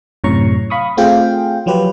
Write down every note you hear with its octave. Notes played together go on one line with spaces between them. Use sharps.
F#2 A2 C3 C#5 A#5 C#6
F5 B5 C#6 D#6
A3 C4 F4 G#4 F5 G5
F3 F#3 F4 G4 B4